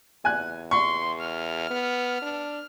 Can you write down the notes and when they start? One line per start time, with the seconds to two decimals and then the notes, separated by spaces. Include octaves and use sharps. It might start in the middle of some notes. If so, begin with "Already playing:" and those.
0.25 E2 G#5 F#6
0.71 C6 C#6
1.20 F6
1.70 B3
2.22 D4